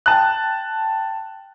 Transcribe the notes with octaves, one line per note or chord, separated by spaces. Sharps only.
G5 A5 F#6